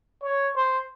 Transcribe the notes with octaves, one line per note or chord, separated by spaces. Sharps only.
C#5
C5